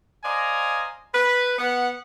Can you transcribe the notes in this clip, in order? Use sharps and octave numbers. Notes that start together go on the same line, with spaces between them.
C5 D5 D#5 F5 G#5 A#5
B4
B3 F#5